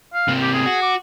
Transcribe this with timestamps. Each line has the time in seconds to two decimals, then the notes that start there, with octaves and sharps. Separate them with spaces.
0.14 F5
0.28 C3 A#3
0.42 G4
0.54 G#4
0.66 F#4
0.82 D6